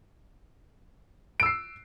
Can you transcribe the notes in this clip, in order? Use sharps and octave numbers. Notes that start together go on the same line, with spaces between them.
E6 C7 D7